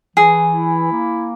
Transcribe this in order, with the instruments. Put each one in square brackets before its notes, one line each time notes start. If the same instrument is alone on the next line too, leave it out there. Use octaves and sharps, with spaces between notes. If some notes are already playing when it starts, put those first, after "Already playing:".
[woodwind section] E3 [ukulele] G#4
[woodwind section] E4
A#3